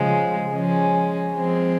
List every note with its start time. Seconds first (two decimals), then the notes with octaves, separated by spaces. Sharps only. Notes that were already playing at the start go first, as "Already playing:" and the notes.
Already playing: C#3 F3 G#3
0.52 F3 G#3 C#4
1.33 F3 G#3 C4